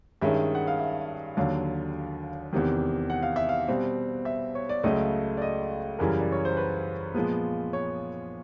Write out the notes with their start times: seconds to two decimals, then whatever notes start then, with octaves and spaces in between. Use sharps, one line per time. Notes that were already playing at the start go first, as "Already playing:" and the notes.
0.21 G2 D#3 G#3 C#4 E5
0.55 F#5
0.67 F5
0.79 E5
1.37 D#2 D3 F#3 F5
2.53 E2 C3 D#3
3.10 F#5
3.23 F5
3.36 E5
3.49 F5
3.68 B2 G3 C4
4.25 E5
4.55 C#5
4.69 D5
4.84 C#2 C#3 F#3 A3 D#5
5.37 D5
5.42 D#5
5.99 F#2 C#3 E3 G3 A#4
6.20 D5
6.32 C#5
6.45 C5
6.57 B4
7.14 A#2 F3 G#3 B3
7.73 C#5